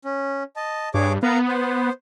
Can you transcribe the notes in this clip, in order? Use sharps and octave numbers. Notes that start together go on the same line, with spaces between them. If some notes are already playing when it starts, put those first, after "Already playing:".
C#4
D#5 A5
G2 G#4 C#5 D6
B3 A#4 F5 A#5
C5